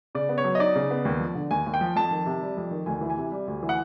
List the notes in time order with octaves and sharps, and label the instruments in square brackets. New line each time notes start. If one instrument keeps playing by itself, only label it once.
[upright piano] C#3 D5
B3
C#5
F#3
D#5
D#4 D5
C#3
B3
D#2
F3
D3
D#2 G#5
D#2
G5
F3
F2 A5
D#3
C3
G3
F2
D#3
D2 G#5
E3
G#5
C3
G3
D2
E3
F#5